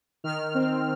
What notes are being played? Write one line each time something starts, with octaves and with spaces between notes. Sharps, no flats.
D#3 F6
C4